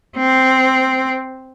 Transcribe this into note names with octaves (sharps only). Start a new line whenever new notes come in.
C4